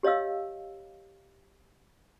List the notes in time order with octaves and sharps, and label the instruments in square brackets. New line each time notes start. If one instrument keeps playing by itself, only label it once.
[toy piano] G4 C#5 D#5 F5 E6